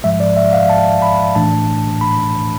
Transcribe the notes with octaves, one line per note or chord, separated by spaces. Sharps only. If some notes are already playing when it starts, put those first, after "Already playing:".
G#2 F3 G#3 E5
D5
E5
F5
A5
B5
A2 E3 A3 D4 A5
B5